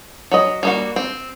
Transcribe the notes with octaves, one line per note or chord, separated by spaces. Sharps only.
F#3 D#5
G3 A#3 F#4
C4